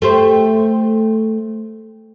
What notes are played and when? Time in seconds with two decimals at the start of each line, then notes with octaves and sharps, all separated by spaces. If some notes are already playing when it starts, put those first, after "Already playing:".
0.02 A3 G4 C5